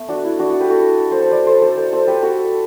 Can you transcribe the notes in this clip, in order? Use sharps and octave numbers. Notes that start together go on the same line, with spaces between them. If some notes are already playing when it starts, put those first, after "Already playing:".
Already playing: A3 B3
D4 F#4
E4
D4 F#4
F#4 A4
G4 B4
F#4 A4
A4 C5
A4 C5
B4 D5
A4 C5
A4 C5
A4 C5
A4 C5
G4 B4
F#4 A4